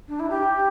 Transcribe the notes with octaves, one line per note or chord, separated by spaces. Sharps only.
D4
E4
G4